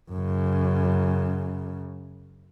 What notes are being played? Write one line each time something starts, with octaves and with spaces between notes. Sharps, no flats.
F#2 C#3